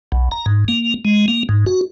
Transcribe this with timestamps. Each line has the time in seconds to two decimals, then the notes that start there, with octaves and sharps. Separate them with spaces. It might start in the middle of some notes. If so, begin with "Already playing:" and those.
0.12 B1
0.31 A#5
0.46 G#2
0.68 A#3
1.05 G#3
1.28 A#3
1.49 G#2
1.66 F#4